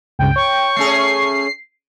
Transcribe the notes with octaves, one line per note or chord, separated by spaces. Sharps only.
C#2 G2 C#3 G5
C#5 C#6
A3 C#4 G#4 C7